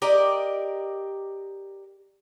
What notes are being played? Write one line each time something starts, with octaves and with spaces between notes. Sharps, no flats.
G4 A#4 D5 D#5